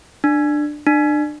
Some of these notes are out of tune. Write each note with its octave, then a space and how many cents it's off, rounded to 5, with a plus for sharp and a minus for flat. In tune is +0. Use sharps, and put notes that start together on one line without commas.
D4 +15
D4 +30